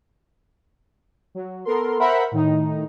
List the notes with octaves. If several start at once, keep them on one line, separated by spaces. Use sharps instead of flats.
F#3
B3 A4 A#4 C6
A#4 C5 E5 F#5 B5
A2 D#3 D#4